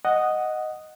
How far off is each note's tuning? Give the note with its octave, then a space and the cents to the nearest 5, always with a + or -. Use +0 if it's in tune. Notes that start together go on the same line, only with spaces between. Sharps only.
D#5 +0 F#5 +0